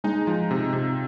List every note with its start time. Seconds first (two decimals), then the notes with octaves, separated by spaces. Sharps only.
0.04 G#3 D#4
0.27 F3
0.51 C3
0.73 C3